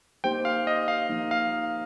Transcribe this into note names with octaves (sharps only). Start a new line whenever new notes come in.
A#3 D#4 G4 C5 G5
F5
D#5
F5
F3 A#3 D#4
F5